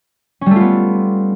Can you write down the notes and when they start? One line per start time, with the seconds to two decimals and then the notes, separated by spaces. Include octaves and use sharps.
0.41 C#4
0.46 G3
0.51 A3
0.56 F4
0.61 B3